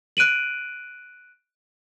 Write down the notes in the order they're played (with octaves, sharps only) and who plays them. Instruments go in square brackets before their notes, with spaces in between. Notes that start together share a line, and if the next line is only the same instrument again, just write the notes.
[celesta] F#6 D7 D#7 F#7